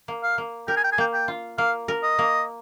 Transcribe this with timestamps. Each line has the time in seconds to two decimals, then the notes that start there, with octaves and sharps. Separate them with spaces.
0.08 A#3
0.23 F5
0.38 A#3
0.68 A#4 G5
0.77 G#5
0.84 G5
0.92 G#5
0.98 A#3 G5
1.13 G5
1.28 F4
1.58 A#3 F5
1.88 A#4
2.03 D#5
2.19 A#3